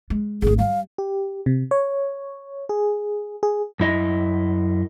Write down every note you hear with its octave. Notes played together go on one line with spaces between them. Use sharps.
G#3
G#1 D2 G#4
G3 F5
G4
C3
C#5
G#4
G#4
F#2 E4 D#5